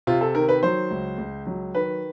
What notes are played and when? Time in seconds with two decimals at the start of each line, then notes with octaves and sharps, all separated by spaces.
0.07 C3 F4
0.21 A4
0.35 D#3 A#4
0.48 B4
0.63 F#3 C5
0.90 C#2
1.18 C#2
1.47 F#3
1.74 D#3 B4